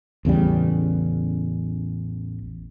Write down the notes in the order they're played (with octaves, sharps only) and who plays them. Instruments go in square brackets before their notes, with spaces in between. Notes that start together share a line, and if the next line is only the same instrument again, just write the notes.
[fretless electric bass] A1 E2 C#3 G3